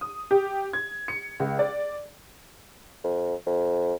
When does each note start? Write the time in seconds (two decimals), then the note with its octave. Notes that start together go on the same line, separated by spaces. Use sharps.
0.01 D#6
0.31 G4
0.73 G#6
1.08 C#7
1.40 C#2
1.59 D5
3.04 F2
3.46 F2